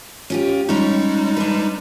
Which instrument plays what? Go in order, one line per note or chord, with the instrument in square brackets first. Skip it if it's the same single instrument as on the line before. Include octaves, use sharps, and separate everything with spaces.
[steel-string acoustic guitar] C#4 F4 G4
[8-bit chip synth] G3 G#3 D#4 [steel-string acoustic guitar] C#4 C#5
[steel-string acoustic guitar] D4 B4